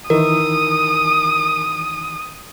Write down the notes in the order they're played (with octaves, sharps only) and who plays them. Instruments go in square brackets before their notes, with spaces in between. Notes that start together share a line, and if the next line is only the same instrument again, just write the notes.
[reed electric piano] D#3 E3 D#4 [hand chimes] A#4 [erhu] D#6